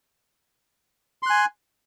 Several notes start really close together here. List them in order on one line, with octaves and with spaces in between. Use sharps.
C6 F#6 G#5